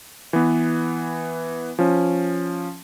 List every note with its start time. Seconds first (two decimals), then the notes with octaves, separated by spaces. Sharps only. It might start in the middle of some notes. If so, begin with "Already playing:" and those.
0.33 E3 B3
1.79 F3 C#4